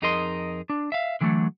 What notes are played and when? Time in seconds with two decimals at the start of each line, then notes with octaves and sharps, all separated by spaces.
0.02 F2 D#4 G#4 A#4 D#5 C6
0.70 D4
0.92 E5 F5
1.21 D3 E3 F#3 G#3 A3